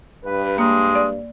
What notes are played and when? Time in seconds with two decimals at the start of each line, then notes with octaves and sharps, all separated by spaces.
0.25 G2 B4
0.58 G#3 A#3
0.95 D5